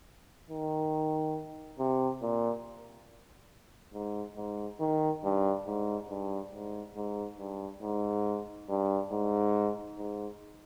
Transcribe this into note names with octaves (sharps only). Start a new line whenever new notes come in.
D#3
C3
A#2
G#2
G#2
D#3
G2
G#2
G2
G#2
G#2
G2
G#2
G2
G#2
G#2